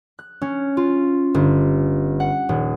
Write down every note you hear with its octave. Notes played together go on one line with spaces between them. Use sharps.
F#6
C#4
F4
G1
F#5
D#1